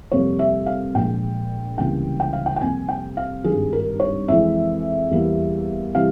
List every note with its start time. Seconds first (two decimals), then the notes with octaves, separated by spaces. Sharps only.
0.12 F2 C3 G3 A#3 C#5
0.39 E5
0.66 F5
0.95 A#1 A#2 G#3 G5
1.78 C#2 C3 E3 G3 A#3 G5
2.20 G5
2.33 F5
2.46 G5
2.56 G5
2.61 F2 C3 G3 A#3 G#5
2.89 G5
3.17 F5
3.44 G#1 G2 G3 G#4
3.73 A#4
4.00 C#5
4.28 F2 E3 G#3 E5
5.11 E2 E3 G3 A#3
5.95 C3 E3 G3 F5